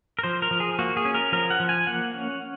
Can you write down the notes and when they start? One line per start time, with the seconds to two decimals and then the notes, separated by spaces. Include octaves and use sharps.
0.19 A#4
0.23 F3 C5
0.42 A#4
0.51 F3
0.60 G#4
0.79 A#3 F#4
0.97 G#4
1.05 C#4
1.14 A#4
1.32 F3 A#4
1.50 F#5
1.60 F3
1.69 G#5
1.87 A#3 F#5
2.14 C#4